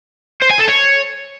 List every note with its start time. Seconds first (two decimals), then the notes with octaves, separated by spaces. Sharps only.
0.42 C5
0.50 G#5
0.59 A4
0.68 C#5